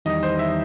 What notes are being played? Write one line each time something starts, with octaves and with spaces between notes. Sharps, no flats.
E2 D#3 G3 D#4 D#5
C5
E5